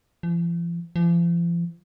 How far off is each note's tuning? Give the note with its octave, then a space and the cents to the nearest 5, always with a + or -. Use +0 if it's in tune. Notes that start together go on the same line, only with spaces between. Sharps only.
F3 -45
F3 -40